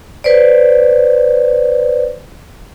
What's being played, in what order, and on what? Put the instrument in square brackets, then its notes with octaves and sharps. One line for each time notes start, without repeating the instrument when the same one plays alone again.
[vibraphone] B4 C5 D5